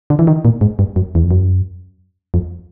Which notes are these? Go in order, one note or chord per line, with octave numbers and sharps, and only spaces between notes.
D3
E3
D#3
A#2
G#2
G2
F#2
E2
F2
F#2
F2